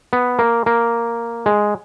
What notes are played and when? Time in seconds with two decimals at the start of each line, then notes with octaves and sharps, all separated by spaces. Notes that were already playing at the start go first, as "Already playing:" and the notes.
0.13 B3
0.39 A#3
0.66 A#3
1.46 G#3